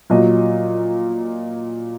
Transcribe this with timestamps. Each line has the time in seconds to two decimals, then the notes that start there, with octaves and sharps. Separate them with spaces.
0.10 A#2 F#3 D#5